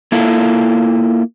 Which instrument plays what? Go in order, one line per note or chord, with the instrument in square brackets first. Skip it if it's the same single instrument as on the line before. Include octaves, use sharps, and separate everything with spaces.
[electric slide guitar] A#3 E4 F4 A4